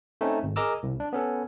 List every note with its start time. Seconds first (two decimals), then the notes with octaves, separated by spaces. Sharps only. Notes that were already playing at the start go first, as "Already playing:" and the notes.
0.21 A3 C4 C#4 D#4
0.43 G#1
0.56 G#4 A#4 D#5 A#5 D6 E6
0.83 C2
1.00 D4
1.13 B3 C#4 A4